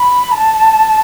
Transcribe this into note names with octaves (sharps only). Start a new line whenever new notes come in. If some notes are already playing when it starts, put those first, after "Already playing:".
Already playing: B5
A5